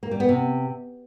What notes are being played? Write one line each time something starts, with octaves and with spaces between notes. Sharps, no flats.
A#3
G3
B3
C3